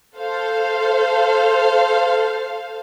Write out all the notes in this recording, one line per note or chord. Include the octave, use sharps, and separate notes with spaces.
A4 C5 F5